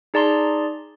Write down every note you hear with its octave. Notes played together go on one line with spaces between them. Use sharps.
D#4 G#4 D5 A5 A#5 C6